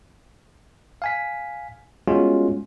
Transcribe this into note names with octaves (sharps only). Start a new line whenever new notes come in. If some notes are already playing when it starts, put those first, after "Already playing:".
F5 G#5 B6
G3 G#3 B3 C#4 F4 F#4